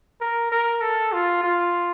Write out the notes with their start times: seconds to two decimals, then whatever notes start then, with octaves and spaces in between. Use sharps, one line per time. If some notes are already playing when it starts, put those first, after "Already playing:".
0.21 A#4
0.51 A#4
0.81 A4
1.12 F4
1.43 F4